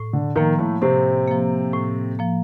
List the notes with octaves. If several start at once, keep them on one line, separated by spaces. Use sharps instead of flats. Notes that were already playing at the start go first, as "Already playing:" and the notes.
Already playing: A2
D3
D#3 F3 A#3
A2 A3
A2 C3 C4
F3 A#3
A2
F3 A#3